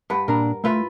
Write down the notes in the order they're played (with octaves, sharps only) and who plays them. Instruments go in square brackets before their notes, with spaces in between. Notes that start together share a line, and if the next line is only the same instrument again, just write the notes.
[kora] G2 B4 F#5
[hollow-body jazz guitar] A#2 D4 A#5 [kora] A#4
[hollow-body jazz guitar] A3 [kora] E4 F4 B4